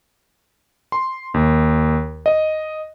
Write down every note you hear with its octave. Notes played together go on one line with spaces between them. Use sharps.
C6
D#2
D#5